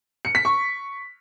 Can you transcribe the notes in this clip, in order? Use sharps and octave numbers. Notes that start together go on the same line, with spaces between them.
C#7
B6
C#6